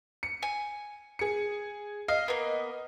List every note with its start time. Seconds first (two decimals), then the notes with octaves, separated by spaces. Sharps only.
0.23 C#7
0.43 G#5
1.19 G#4 C#7
2.08 D#5 F5
2.28 A#3 B3